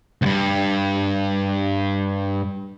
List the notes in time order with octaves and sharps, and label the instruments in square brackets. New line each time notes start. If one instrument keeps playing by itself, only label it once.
[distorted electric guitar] D2 G2